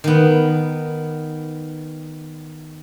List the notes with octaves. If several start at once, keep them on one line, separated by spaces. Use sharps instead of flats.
D#3 B3